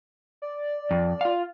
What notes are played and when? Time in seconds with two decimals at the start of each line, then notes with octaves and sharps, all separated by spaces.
0.42 D5
0.91 F2
1.21 F4 F5